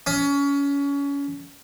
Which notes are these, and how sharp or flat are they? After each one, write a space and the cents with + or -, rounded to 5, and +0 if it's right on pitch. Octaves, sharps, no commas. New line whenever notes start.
C#4 +25